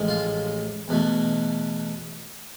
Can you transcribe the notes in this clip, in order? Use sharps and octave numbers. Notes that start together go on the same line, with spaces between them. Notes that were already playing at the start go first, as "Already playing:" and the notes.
Already playing: A1 A2 F3 G#3
F4
E2 B2 A3